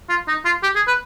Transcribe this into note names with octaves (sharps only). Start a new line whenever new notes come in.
F4
D#4
F4
G4
G#4
B4